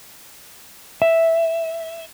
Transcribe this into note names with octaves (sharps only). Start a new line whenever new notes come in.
E5